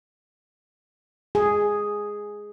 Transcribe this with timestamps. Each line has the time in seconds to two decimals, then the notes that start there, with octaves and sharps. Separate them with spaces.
1.35 G#4